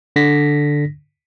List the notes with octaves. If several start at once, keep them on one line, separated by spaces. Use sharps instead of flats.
D3 A#6 B6